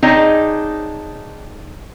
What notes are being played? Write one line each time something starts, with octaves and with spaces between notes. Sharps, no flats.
C4 D4 D#4 G#4 C#5 D#5